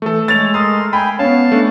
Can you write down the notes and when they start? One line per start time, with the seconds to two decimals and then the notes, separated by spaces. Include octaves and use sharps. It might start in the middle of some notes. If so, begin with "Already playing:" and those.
0.02 E3 A3 A4
0.28 G#3 C#5 A6 F7
0.54 A#4 C6 D#6
0.93 G5 G#5 B5
1.19 B3 C#4 F5 A5
1.52 A3 D4